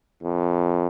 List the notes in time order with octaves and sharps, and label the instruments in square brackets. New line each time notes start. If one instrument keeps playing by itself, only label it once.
[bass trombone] F2